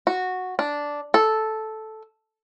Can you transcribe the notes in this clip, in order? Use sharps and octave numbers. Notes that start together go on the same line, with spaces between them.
F#4
D4
A4